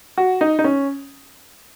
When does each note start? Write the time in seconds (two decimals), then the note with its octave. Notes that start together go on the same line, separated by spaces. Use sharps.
0.18 F#4
0.41 D#4
0.59 D#4
0.64 C#4